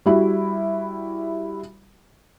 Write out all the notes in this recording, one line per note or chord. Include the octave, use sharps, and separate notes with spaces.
G3 E4 F#4